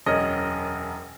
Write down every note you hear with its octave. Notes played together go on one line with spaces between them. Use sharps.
E1 F#2 C#4 A#4 D#5